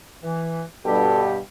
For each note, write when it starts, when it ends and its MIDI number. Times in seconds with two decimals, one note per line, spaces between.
0.22 0.63 52
0.86 1.39 43
0.86 1.39 47
0.86 1.39 55
0.86 1.38 67
0.86 1.25 69